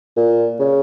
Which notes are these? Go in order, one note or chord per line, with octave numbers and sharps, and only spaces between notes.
A#2
C#3